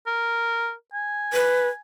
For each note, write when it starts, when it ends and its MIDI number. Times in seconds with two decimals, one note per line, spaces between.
0.07 0.72 70
0.94 1.79 80
1.33 1.68 71